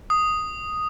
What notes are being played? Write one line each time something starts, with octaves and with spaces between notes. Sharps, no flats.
D#6